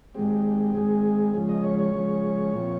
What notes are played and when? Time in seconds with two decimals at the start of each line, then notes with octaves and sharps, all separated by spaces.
0.14 G#2 D#3 G#3 C4 G4
0.74 G#2 D#3 G#3 C4 G#4
1.34 C#3 F3 G#3
1.49 D#5
1.63 C#5
1.79 C#5
1.94 C#3 F3 G#3
2.53 A#2 F3 C4